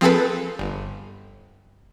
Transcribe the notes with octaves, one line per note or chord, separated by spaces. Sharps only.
F3 C4 G#4 A4 B4
G1